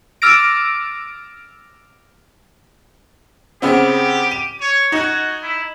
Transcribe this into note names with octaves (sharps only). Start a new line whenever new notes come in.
D6 E6 F6 A6 A#6 D7
C#3 B3 C4 G4
D#7
C#5
D#4 F#4 G#6
E4